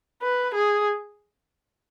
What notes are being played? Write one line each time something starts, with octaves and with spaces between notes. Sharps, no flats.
B4
G#4